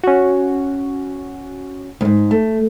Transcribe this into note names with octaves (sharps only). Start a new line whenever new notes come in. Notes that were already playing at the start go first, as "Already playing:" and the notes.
C#4 F#4
D2 G#2
A3